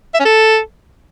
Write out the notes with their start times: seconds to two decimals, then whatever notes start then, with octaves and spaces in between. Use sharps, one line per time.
0.14 E5
0.20 C#4
0.25 A4